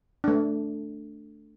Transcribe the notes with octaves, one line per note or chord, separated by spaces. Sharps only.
A3 D4